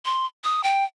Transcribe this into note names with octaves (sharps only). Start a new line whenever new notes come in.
C6
D#6
G5